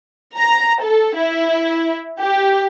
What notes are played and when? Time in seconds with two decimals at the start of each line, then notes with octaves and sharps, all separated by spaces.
0.37 A#5
0.83 A4
1.16 E4
2.21 G4